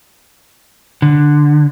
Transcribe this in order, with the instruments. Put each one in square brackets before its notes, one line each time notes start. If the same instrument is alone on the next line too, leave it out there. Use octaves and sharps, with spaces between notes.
[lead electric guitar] D3